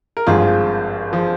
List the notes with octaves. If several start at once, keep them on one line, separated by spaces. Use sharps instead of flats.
A#4
G#1 G2 F3 F4 G#4
F3